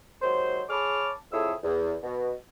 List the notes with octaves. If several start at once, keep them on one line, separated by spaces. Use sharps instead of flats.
D#2 F#3 G#3 C5
G#4 C#5 A5 B5 D6 F6
F2 E4 G#4 A4 C#5 E6
E2
B2